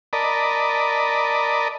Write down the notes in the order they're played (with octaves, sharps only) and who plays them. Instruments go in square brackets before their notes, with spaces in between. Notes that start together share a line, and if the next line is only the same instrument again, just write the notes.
[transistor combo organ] A#4 D5 D#5 A5 B5